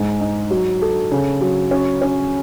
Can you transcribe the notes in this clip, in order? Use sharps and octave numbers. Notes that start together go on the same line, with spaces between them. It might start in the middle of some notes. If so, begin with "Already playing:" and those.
Already playing: G#2 G#3
D#4
F#3
A4
C#3
F#3
C#4
C#4